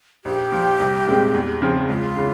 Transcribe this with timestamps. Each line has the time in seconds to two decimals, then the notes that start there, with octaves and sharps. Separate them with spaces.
0.25 A#1 G4
0.52 A#2 F3
0.80 C2
1.07 A#2 G#3 C4
1.35 E2
1.62 C#3 F3 C4 F4
1.90 C#2 F4
2.16 C#3 E3